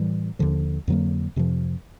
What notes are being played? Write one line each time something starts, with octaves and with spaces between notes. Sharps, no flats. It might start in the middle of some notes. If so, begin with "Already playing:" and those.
Already playing: A2 E3 G3
D#2 D3 F3
F2 D3 F#3 A#3
F2 C3 F3